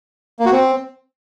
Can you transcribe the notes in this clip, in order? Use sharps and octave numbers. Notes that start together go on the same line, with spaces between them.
A#3
F#4
C4